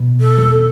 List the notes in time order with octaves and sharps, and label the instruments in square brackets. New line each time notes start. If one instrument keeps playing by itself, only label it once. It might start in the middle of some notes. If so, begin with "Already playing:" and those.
Already playing: [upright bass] B2
[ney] A4
[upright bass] E2